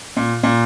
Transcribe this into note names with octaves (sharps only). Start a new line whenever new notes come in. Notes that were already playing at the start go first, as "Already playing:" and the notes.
A#2
A#2